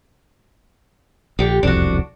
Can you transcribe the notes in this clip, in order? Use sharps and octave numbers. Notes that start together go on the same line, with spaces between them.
A#1 D3 G4
E1 C2 F2 D4 F#4